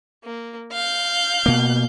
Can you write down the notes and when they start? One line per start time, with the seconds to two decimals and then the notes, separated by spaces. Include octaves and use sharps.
0.24 A#3
0.73 F5 G6
1.46 B2 A#3